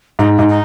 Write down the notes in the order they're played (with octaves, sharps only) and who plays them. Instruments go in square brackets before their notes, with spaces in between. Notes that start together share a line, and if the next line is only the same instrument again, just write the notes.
[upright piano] G#2 [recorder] D#4
[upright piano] G#2 [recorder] D#4
[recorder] D#4